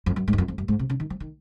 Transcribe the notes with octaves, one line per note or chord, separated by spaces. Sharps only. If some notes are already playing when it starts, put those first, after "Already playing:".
F2
F#2
G#2
F#2
F2
F2
F#2
G#2
C3
C#3
D#3
F3
D#3